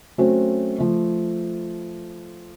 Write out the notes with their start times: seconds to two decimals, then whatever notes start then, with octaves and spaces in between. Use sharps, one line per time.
0.18 F#3 A3 C4 C#4 F#4 C5
0.78 F3 A3